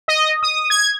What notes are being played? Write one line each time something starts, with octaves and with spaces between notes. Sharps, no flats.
D#5
D#6
G#6